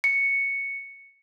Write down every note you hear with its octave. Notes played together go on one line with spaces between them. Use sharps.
C#7